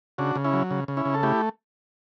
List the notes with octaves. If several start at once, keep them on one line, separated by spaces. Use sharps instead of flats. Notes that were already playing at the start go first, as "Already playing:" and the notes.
C#3 D4 F#4
C#3
C#4 E4
F#3
C#3
C#3
C#4 E4
C#3
A4
A3 E4 G4